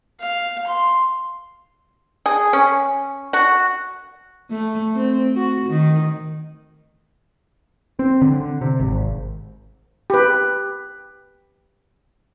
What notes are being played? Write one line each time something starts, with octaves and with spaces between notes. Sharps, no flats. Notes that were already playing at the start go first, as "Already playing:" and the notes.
F5
C6
G#4
C#4
F#4
A3
C4
F#4
D#3
C4
D3
C3
G#1
G4 B4